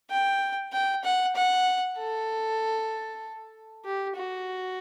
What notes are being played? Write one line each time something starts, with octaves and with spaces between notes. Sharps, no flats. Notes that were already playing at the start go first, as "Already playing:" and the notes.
G5
G5
F#5
F#5
A4
G4
F#4